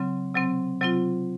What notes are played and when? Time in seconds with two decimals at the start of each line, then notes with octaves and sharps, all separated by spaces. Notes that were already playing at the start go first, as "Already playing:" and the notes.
Already playing: C#3 F#3 C4
0.34 C3 F#3 C4
0.81 C3 F#3 C4 F4